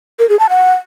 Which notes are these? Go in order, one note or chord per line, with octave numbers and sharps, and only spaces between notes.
A#4
G#4
A5
F#5